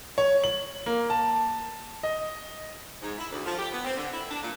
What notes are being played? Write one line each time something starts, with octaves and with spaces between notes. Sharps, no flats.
C#5
F#7
A#3
A5
D#5
G#2
E4
D2
F3
G4
B3
C4
D3
E4
D4
A#2